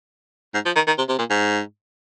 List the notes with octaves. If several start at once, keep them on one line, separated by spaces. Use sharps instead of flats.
G#2
F3
D#3
D#3
C3
C3
A#2
G#2